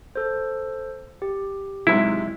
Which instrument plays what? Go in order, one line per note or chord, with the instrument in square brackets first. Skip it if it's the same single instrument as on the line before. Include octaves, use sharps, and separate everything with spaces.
[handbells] A4 C5
G4
[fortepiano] G#2 C3 F#3 [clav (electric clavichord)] E4